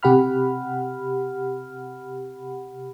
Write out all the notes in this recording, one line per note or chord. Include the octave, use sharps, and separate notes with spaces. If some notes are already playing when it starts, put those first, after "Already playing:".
C3 G4 F#5 B5 F6